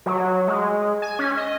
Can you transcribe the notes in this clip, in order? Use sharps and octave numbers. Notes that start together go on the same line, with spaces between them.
F#3
G#3
G#5
C#4
D#5